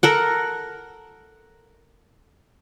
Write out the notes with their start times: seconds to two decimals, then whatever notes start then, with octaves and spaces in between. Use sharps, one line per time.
0.03 A4 A#4 F#5